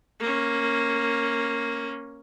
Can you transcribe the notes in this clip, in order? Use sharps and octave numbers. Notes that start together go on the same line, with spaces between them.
A#3 C#4